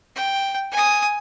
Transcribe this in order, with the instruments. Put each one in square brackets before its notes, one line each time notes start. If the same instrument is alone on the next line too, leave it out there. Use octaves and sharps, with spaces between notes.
[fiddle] G5
G#5 D#6